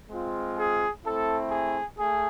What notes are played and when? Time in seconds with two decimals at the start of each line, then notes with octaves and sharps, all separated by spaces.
0.10 G#3 C4 F4
0.58 G#4
1.05 A3 C4 E4 A4
1.51 G#4
1.98 A3 G#4